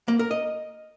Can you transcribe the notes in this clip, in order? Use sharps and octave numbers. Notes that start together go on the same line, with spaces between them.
A#3
A#4
D#5